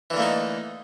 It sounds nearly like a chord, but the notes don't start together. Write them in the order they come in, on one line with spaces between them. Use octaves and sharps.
E3 D3 A#3 A3 D#4